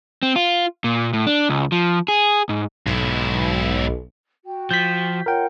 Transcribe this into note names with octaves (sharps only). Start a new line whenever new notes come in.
C4
F4
A#2
A2
D4
C#2
F3
G#4
G#2
B1 G#2 E4
F#4 G5
F3 G6 B6
F4 A#4 C#5 F#5 G5